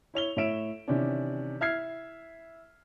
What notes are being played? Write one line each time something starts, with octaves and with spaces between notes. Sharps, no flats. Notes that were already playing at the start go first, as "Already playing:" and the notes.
E4 C#5 F7 G7
A2 C#5 E5 D7 E7
C3 D#3 E3 C#4 D4
E4 E5 F6 G#6 C7